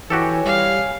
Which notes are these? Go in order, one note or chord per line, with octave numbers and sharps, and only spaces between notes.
E3 F#4 G4 A4 C#5 G#5
G3 F5